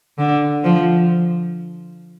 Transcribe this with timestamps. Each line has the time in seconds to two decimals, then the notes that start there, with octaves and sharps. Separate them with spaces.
0.19 D3
0.64 F3